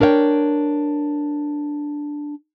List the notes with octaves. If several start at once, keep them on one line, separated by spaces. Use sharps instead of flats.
D4 A#4 C#5 F5 G5